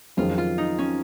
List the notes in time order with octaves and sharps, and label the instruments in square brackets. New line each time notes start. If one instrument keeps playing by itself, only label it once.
[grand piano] F2 D#3 F#3 C#4 G#4 [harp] F4
[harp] F4
D#4
C#4